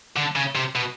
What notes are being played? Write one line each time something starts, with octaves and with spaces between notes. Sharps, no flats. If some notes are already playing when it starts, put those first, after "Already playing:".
D3
C#3
C3
B2